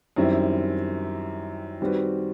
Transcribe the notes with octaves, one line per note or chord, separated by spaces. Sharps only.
F#2 D#3 G3 C4 E4
D#3 G3 C4 F#4 B4